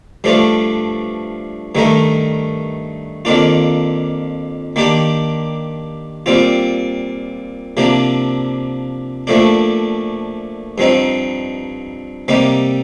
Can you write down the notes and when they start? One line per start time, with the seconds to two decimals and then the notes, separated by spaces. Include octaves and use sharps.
0.24 G2 F3 A3 D4 F4
1.75 G2 D#3 A3 D#4 A#4
3.25 F2 D#3 A#3 D4 F4
4.76 D#3 A#3 D4 G4
6.26 A#2 G3 C4 F4
7.77 C3 F3 A#3 D4
9.27 A#2 F3 A3 D4
10.78 G2 F3 C4 D#4
12.28 C3 G3 A#3 D#4